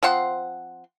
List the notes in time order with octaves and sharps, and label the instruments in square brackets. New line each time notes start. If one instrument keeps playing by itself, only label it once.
[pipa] F3 C4 F#5 C6